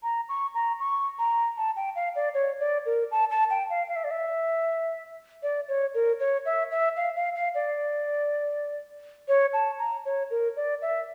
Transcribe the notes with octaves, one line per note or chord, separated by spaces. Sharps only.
A#5
C#6
A#5
C#6
A#5
A5
G5
F5
D5
C#5
D5
A#4
A5
A5
G5
F5
F5
E5
D5
E5
D5
C#5
A#4
C#5
E5
E5
F5
F5
F5
D5
C#5
A5
A#5
C#5
A#4
D5
E5